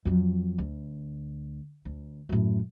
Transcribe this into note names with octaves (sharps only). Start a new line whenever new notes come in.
F2 F#3
D2
D2
F#2 A2